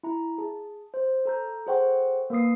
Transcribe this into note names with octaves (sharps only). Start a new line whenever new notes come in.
E4 A#5
G#4 A5
C5
A4 A#5 G6
G#4 A4 C5 F#5 G5 C#6
A#3 A#4 B4 D#6 C7